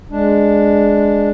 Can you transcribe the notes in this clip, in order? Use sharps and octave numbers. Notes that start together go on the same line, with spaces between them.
G#3 D4